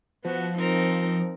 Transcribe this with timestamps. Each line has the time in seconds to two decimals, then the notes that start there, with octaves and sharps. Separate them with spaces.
0.25 F3 B3 F#4
0.58 C4 D#4 A#4